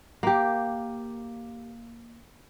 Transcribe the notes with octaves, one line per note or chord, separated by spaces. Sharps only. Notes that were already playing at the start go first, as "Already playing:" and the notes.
A#3 G4